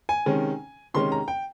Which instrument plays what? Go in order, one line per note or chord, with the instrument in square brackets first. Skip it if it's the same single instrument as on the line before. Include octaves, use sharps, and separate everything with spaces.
[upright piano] G#5
C3 D#3 G#3 C#4
C3 D#3 G#3 C#4 C6
A#5
G5